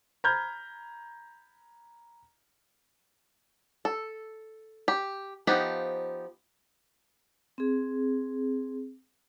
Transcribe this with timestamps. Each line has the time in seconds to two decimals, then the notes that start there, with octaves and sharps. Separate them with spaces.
0.24 A#5 B5 F6 G6 G#6
3.85 A4
4.88 G4
5.47 F3 B3 D#4 G4
7.58 C4 G#4